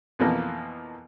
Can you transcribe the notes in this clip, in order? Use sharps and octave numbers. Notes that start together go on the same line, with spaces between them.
F2 B2 E3 F3 A#3